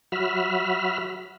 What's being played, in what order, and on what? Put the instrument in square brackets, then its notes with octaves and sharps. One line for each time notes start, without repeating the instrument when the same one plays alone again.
[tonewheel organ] F#3 F#4 E5 B5 F6